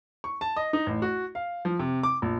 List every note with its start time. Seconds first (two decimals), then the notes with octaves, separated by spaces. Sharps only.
0.24 C#6
0.41 A5
0.56 D#5
0.73 D#4
0.87 A1
1.02 F#4
1.35 F5
1.65 F3
1.79 C3
2.03 D6
2.22 A#1